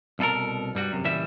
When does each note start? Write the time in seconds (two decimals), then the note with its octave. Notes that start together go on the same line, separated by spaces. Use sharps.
0.19 C2 B2 D#4 A4 A#4
0.75 G2 G3 F#4
0.92 F#2 C3
1.04 C#2 A#2 E3 G3 E5